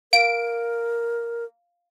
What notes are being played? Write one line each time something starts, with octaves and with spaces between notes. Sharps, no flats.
A#4 F5 D7